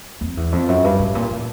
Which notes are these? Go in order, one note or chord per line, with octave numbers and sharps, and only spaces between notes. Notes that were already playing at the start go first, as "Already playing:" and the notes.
F2
E2
F2
F#2
G2
A2
A#2
A#2